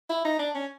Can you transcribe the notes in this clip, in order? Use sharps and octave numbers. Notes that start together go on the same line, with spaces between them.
E4
D#4
D4
C#4